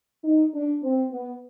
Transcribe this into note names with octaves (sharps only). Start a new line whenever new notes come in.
D#4
D4
C4
B3